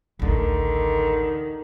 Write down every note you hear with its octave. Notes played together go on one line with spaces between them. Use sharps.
A1 D2 D3 D#3